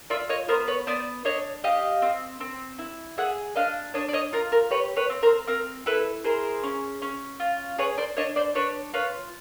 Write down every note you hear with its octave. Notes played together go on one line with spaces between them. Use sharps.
F4 D5 E5
C#5 D#5
B3 A#4 C5
B4 C#5
B3 C5 D5
D4 C#5 D#5
G4 D#5 F5
C4
C4
E4
G#4 E5 F#5
D4 D#5 F5
D4 C#5 D#5
D5
C#5 D#5
F4 A#4
A#4
G4 B4 C#5
B4 C#5
C4
A#4 C5
C4 A#4
E4 A4 B4
G#4 A#4 C5
C#4
C#4
F4
G#4 B4 C#5
C5 D5
D4 C#5 D#5
C5 D5
D4 B4 C#5
F4 B4 C#5